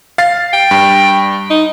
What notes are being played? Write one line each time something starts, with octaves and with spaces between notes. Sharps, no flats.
F5 A6 C7
G5
G2
D#4